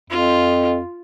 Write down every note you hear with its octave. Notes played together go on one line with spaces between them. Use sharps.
F2 F4